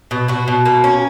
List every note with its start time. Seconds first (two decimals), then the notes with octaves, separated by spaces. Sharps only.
0.11 B2
0.28 B2 F#4
0.48 B2
0.65 A#3
0.84 C#4